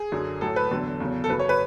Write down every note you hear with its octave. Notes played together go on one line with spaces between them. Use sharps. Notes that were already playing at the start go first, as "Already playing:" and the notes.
Already playing: G#4
F#2 D3 F#3
A2 F#3 A4
B4
E2 D3 F#3 A4
E2 C#3 F#3
A4
F#2 C#3 F#3 B4
C#5
B4